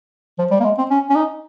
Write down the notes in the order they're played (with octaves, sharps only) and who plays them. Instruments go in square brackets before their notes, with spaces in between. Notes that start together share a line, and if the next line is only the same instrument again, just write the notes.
[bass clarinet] F3
G3
A#3
G#3
C4
C#4
C#4
D#4